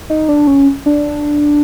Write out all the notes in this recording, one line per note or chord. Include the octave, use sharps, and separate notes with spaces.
D#4
D4
C#4
D4